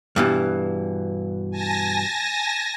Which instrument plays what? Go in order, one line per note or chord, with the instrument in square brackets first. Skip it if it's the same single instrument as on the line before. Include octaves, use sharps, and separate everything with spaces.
[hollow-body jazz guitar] G2 B2 E3
[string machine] G#5 A5 A#6